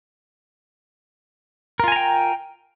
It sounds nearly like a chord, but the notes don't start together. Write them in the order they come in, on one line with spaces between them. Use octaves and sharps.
A#4 F4 G#5 A#5 G5